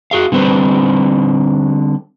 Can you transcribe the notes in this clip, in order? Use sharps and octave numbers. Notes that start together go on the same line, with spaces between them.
F#4 G#4 F5
D3 G3 C4 B4 C5